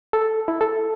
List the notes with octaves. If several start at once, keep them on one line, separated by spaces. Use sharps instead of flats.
A4
E4
A4